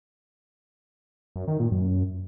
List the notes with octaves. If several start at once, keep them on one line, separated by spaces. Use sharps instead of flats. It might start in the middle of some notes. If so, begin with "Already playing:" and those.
F#2
D#3
A#2
F#2